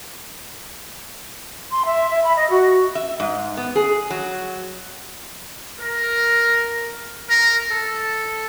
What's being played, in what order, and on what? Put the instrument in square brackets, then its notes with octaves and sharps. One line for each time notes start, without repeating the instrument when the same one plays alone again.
[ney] C6
E5
E5
B5
D#5
F#4
[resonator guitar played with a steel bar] E5
G#2
B3
G#4
F#3
[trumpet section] A#4
A#4
A4